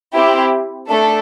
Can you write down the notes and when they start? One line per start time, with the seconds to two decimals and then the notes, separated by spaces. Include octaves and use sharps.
0.16 C4 E4 G4
0.90 A3 D4 A4